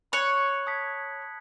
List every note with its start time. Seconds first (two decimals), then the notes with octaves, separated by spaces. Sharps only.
0.12 C#5 B5 F#6 C#7 F#7
0.67 A5 D#6 G#6 B6